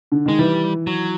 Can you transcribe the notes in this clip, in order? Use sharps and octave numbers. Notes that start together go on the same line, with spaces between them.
D3
D#3 G#3
E3 G3
F#3